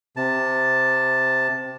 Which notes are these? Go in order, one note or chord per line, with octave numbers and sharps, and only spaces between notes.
C3 A5